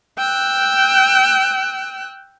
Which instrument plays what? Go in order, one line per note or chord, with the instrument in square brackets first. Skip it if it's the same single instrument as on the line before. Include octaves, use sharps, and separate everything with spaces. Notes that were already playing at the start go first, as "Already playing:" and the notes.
[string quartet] G5 E6 F#6